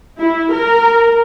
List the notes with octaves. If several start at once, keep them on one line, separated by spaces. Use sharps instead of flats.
E4
A#4